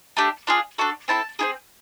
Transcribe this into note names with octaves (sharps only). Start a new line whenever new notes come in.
A3 D4 G4
D4 F4 G#4
D4 F#4 A4
C4 E4 A4 A5
C4 E4 G#4